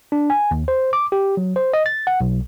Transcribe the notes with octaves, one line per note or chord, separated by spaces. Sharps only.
D4
G#5
D#2
C5
D6
G4
F#3
C5
D#5
A6
F#5
B1